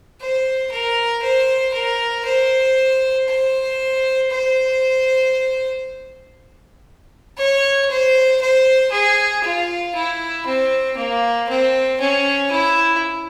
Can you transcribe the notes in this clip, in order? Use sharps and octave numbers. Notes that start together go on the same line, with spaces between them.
C5
A#4
C5
A#4
C5
C5
C5
C#5
C5
C5
G#4
F4
E4
C4
A#3
C4
C#4
E4